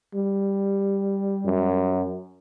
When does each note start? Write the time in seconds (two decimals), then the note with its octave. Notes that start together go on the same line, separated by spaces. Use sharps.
0.14 G3
1.46 F#2